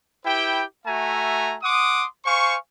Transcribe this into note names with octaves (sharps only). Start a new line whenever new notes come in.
E4 G4 B4 G5
A3 F#4 E5 G#5 A#5
F#5 C6 D6 D#6
C5 F5 G#5 C#6